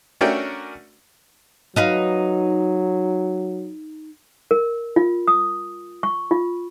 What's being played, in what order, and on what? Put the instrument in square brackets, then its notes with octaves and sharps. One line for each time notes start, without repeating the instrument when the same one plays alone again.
[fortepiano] A3 C#4 D4 F#4 A#4 G5
[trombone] F#3 [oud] D#4 B4 F5
[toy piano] A#4
F4
D#6
C#6
F4